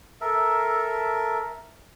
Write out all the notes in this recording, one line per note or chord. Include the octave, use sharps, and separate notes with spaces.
A4 A#4 E5